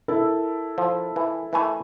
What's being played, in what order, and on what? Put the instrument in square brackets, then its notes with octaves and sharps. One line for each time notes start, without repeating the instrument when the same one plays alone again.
[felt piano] E4 A4 A#4
[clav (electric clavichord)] F3
E3
E3 A3 G#5